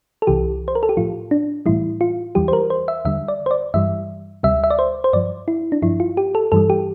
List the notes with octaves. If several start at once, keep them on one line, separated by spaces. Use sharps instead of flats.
A4
C2 C3 E3 G4
C5
A#4
A4
G4
A2 F3 F4
D4
A2 E3 G3 E4
F4
E2 E3 G3 G4
C5
A#4
C5
E5
E2 D3 G3 E5
D5
C5
D5
G2 E3 G3 E5
D2 C3 G3 E5
E5
D5
C5
C5
G2 F3 D5
E4
D4
G2 F3 E4
F4
G4
A4
G2 E3 G3 A4
G4